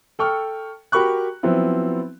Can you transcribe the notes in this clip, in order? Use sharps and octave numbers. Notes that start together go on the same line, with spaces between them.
A4 G5 C#6 F6
F#4 G4 A#4 B5 C#6 F#6
F3 F#3 B3 C4 E4